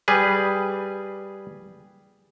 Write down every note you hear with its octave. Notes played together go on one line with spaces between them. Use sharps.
G3 G#4 B4